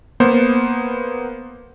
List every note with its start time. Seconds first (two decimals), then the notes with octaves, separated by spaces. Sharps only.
0.20 A#3 B3 C5